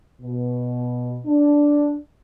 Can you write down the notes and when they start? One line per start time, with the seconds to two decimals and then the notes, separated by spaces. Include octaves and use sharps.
0.21 B2
1.26 D4